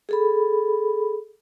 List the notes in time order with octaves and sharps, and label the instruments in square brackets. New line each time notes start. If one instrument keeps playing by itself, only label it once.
[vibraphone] G#4 A4 B5